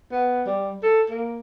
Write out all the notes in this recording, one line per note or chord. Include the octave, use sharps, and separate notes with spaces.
B3
G3
A4
A#3